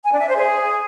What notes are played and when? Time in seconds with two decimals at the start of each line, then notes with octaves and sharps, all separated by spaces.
0.04 G#5
0.12 D4
0.20 E5
0.28 C5
0.36 G#4